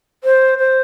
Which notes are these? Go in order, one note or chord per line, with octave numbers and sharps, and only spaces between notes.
C5
C5